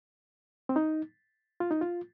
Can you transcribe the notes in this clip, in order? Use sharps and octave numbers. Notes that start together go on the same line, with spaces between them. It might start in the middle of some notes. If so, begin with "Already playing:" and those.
C4
D#4
F4
D#4
F4